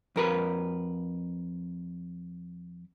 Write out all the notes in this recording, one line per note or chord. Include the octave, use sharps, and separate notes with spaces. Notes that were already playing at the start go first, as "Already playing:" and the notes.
F2 A#4 B4